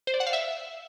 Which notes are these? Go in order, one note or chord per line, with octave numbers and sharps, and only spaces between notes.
C5
D5
F#5
F5
E5